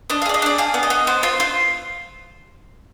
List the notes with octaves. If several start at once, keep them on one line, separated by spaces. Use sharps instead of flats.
D4 D#5
F5
G#4 D5
D#5
D4 D5
G#4 F5
B3
D#5
B3
B3 C5
F4 C5
F4 C5